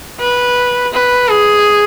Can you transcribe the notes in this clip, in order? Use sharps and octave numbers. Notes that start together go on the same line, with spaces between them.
B4
B4
G#4